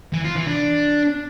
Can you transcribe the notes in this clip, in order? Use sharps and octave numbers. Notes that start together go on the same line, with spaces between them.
E3
F4
E3
D4